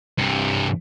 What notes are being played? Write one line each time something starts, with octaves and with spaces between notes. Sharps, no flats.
G2 C3